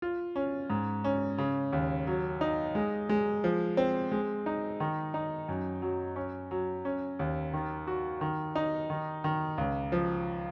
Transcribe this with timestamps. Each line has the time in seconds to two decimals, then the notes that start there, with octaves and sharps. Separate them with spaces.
0.02 F4
0.36 C#4
0.70 G#2
1.04 C#4
1.38 C#3
1.73 D#2
2.07 F#3
2.41 D#4
2.75 G#3
3.09 G#3
3.44 F3
3.77 C4
4.11 G#3
4.46 D#4
4.80 D#3
5.14 D#4
5.48 F#2
5.82 F#3
6.16 C#4
6.51 F#3
6.85 C#4
7.19 D#2
7.53 D#3
7.87 F#4
8.21 D#3
8.55 D#4
8.90 D#3
9.24 D#3
9.58 C#2
9.92 F3